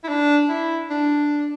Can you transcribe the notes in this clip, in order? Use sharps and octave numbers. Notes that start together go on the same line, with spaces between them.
E4
D4
E4
D4